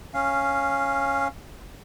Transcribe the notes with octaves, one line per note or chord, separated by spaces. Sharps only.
C#4 F5